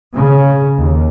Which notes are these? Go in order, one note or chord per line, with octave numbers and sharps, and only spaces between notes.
C#3
D#2